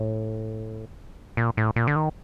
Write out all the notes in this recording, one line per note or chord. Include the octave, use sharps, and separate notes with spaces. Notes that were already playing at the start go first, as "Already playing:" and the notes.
Already playing: A2
A#2
A2
A#2
D3
D#3